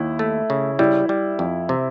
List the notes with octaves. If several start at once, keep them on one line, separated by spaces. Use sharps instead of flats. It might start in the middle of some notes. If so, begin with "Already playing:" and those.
Already playing: D#2 E4
A3
C#3
G3 E4
G3
F2
C3